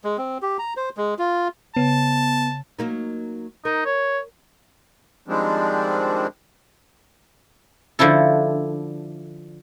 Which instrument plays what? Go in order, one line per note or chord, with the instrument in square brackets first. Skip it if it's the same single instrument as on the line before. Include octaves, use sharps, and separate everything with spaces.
[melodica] G#3
C4
G4
A#5
C5
G#3
F4
[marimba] C#3 [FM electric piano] B3 [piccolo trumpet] A5
[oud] F#3 A#3 D#4
[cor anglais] D#4 [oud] A#4
[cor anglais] C#5
[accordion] D#3 F3 G3 G#3 C4 D4
[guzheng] D3 F3 D4 E4 A4